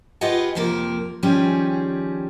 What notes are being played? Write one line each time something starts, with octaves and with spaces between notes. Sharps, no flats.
F4 G4 G#4 B4 D#5 F#5
F2 C3 F3 A#3 A#4
D#3 F3 G3 C#4 G4 G#4